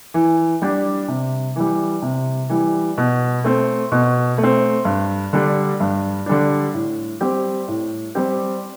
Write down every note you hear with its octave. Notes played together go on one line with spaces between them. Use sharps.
E3
G3 D4 G4
C3
E3 G3
C3
E3 G3
B2
A3 C4
B2
A3
C4
G2
D3 G3 D4
G2
D3 G3 D4
A2
G3 C4 G4
A2
G3 C4 G4